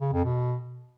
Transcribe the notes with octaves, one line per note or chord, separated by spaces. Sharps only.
C#3
F2
B2